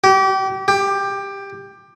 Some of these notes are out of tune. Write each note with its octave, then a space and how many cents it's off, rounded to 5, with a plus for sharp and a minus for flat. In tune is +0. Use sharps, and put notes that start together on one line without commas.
G4 -30
G4 +15